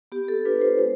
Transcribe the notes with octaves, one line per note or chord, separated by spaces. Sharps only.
B3 G4
A4
D4 F4 B4
C5
G#3 C5